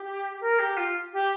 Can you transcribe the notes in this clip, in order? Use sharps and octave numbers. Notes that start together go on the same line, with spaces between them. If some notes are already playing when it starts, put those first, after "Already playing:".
Already playing: G4
A#4
G4
F4
G4